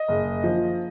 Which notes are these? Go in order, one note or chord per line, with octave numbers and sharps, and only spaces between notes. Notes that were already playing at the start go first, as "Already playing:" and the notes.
Already playing: D#5
F#1
F3